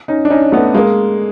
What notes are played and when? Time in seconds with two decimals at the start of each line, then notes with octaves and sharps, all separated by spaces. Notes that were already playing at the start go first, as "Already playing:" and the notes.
0.08 C#4 D#4
0.25 D4
0.30 C#4 D#4
0.52 A3 B3
0.74 G#3 A#3